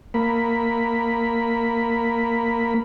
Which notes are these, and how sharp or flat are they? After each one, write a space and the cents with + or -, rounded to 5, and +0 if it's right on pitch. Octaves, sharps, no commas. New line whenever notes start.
A#3 -10 B5 +0